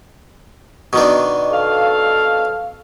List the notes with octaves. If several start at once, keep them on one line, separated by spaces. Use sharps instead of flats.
B2 D#3 D4
A4 F5